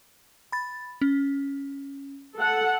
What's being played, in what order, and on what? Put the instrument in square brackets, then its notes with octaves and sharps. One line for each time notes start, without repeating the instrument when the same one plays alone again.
[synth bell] B5 A6
C#4
[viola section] A4 F#5